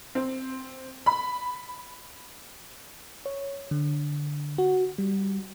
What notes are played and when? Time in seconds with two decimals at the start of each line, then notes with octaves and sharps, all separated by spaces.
0.15 C4
1.06 B5
3.26 C#5
3.71 D3
4.58 F#4
4.98 G3